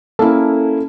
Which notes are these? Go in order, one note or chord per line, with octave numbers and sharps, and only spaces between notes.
A#3 C#4 E4 A4